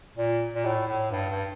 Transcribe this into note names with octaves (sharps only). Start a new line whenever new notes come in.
A#2
A#2
A2
A2
G2
G2